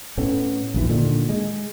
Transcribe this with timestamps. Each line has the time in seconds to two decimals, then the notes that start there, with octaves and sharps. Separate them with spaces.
0.17 A2 A3 B3 C#4
0.74 A#1 D#2 E3
0.89 A#2 D3 D#3
1.29 G#3